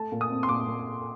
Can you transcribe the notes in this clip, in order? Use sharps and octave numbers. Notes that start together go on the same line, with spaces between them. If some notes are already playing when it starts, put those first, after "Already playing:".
Already playing: A3 A5
A#2
D#6
C4
C6
A#2 D6
A#2